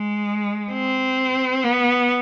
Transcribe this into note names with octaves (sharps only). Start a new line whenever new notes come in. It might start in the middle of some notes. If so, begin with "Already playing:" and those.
Already playing: G#3
C4
B3